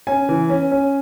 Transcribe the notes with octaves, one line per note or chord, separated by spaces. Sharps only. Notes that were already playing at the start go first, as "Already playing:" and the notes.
C#4 G#5
E3
C#4
C#4